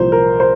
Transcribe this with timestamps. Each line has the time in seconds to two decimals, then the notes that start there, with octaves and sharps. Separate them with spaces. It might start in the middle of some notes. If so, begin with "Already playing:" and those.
Already playing: C2 A#2 F3 A#3 C5
0.12 A#4
0.40 C5